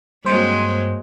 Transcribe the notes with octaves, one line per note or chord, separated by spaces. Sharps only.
G2 F#3 G#3 A#3 C4 C5